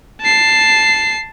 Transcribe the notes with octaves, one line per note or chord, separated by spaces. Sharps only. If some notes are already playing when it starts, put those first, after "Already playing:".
A5 C7